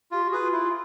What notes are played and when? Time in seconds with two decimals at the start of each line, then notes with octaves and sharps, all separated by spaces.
0.11 F4 G4
0.25 F#4
0.32 G#4 B4
0.39 F4
0.52 E4